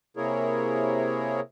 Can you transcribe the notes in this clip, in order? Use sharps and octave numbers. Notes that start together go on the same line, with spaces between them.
C3 A#3 E4 G#4 A#4 C#5